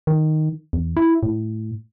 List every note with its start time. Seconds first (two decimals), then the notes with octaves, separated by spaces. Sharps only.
0.07 D#3
0.73 E2
0.97 E4
1.23 A2